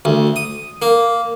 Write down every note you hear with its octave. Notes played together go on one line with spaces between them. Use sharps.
D2
D#6
A#3